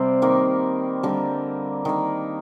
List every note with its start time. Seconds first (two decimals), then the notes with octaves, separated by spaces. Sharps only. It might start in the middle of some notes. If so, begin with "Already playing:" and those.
Already playing: C3 G3 C4 C5 D5 F5
0.22 D#3 A#3
1.03 D3 G3 A#3
1.85 D#3 A#3